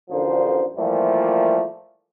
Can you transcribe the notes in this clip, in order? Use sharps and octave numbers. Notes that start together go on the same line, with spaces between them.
A1 D2 D3 F3 A#4 C5
A#2 E3 F3 G3 A3 A#3